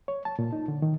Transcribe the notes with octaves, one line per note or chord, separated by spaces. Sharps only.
C#5
A5
A#2
D#4
D3
D#3